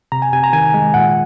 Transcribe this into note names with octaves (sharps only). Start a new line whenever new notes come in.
C3 A#5
G#5
C3 G#5
A#5
D#3 G#5
G#3
A#2 F#5